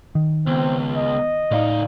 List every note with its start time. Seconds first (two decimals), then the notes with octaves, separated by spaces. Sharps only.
0.15 D#3
0.47 C#2 B3 C4
0.95 D#5
1.51 C#2 A2 D#4 D5 F5